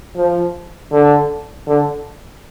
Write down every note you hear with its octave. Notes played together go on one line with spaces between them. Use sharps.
F3
D3
D3